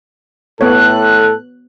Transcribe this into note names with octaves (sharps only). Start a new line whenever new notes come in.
A2 B3 A4 C#5 F#6